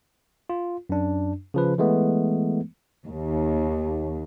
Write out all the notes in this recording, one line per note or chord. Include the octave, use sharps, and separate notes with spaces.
F4
F#2 D4
C#3 F3 B4
E3 G#3 A3 B3
D#2